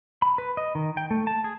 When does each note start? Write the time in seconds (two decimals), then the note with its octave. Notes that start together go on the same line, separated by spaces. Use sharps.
0.22 B5
0.38 B4
0.57 D#5
0.75 D#3
0.97 G5
1.11 A3
1.27 A5
1.44 G#4